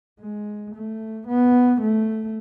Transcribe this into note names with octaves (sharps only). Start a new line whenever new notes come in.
G#3
A3
B3
A3